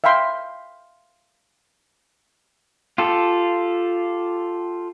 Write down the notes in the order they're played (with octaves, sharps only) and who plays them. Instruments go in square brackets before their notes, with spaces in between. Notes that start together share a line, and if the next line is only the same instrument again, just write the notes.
[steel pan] E5 F5 G5 B5 C6
[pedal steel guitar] F4 G4 A4